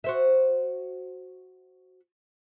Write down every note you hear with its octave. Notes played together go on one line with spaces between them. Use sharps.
F#4 C5 E5